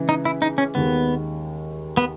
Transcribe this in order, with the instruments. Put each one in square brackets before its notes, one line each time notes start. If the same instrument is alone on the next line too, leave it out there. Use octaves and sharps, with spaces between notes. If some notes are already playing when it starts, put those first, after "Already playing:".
Already playing: [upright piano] C#3 E3 G#3
[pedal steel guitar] D#4
E4
D#4
C#4
[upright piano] D#2 D#3 G#3 [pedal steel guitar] B3
[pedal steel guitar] B3